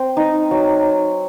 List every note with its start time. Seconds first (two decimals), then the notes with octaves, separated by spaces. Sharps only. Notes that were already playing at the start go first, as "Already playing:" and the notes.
Already playing: C4
0.17 D#4
0.51 F#3